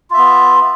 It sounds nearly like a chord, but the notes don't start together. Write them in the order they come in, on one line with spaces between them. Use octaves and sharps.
F4 E5 B3